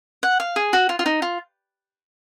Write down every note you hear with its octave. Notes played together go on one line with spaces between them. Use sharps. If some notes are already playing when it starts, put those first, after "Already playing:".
F#5
F5
G#4
F#4
F4
F4
D#4
F4